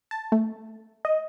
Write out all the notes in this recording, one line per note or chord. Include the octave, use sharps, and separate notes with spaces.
A5
A3
D#5